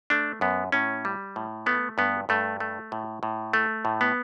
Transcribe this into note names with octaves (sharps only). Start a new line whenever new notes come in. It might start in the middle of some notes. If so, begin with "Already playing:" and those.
A3 D4
F#2 B3
A2 C#4
G3
A2
A3 B3
G2 B3
G2 A3
A3
A2
A2
A3
A2
B3